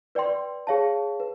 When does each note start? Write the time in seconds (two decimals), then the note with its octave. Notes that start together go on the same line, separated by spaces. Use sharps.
0.15 B4 D5 G5 C6
0.67 G#4 C#5 F5 A5
1.20 B4